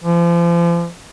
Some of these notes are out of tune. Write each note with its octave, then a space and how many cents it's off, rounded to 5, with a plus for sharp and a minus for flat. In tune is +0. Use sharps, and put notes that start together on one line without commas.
F3 -35